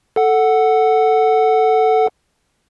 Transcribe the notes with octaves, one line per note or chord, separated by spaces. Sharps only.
A4 F#5